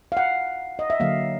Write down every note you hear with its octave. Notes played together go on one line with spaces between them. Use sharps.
F5
F#5
D#5
E5
D3 F#3 A#3 F5